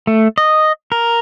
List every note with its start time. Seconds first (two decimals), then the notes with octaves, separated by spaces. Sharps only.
0.07 A3
0.38 D#5
0.92 A#4